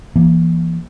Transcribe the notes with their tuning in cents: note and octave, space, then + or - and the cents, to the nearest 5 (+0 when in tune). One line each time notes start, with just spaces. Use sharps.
E3 +30 A#3 +25